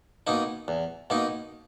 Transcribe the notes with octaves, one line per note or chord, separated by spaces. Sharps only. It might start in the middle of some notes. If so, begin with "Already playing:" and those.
B2 A#3 D#4
E2
B2 A#3 D#4